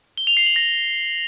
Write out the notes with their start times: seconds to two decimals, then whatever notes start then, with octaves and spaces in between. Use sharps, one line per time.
0.17 G7
0.27 F7
0.37 C7
0.46 F#7
0.56 A#6